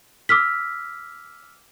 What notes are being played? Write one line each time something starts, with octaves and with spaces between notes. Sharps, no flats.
D6 E6 F6 B6